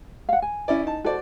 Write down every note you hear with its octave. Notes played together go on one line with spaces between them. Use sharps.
F5 F#5
G#5
C#4 E4 D5
D#4 A5
F#4 A4 C5 D5